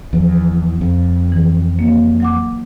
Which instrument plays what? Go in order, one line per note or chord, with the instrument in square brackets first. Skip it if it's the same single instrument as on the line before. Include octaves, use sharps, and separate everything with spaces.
[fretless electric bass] E2 [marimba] F3
[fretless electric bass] F2
[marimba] E3
A#3
F#3 F#5 D6